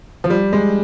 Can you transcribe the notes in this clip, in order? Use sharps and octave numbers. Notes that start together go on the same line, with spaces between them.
F3
G3
G#3